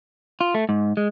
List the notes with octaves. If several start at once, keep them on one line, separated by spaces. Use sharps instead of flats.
F4
A3
G#2
G#3